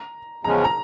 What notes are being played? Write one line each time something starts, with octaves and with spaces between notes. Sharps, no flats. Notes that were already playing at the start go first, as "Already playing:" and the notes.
Already playing: A#5
E2 C#3 F3 G#3 C#4 A#5
A#5